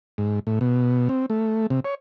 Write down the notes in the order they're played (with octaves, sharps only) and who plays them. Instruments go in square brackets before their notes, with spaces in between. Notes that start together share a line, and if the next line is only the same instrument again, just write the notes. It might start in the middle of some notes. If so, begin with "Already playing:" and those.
[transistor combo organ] G#2
A2
B2
C4
A3
C3
C#5